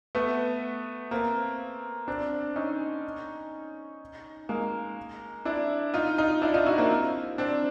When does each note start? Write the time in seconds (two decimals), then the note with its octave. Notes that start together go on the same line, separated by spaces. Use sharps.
0.15 A3 B3
1.11 A#3 C4
2.08 C4 D4
2.56 C#4 D#4
4.49 G#3 A#3
5.45 D4 E4
5.94 D#4 F4
6.18 D#4 F4
6.42 D4 E4
6.54 D#4 F4
6.66 E4 F#4
6.78 A#3 C4
7.38 C4 D4